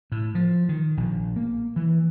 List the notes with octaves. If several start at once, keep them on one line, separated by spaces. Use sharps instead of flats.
A2
F3
D#3
A#1
A#3
E3